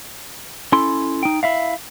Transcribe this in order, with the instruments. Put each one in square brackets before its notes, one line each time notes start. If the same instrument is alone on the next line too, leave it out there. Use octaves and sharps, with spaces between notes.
[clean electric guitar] C#4 E4 A4 C6
D#4 G5
E4 E5 F5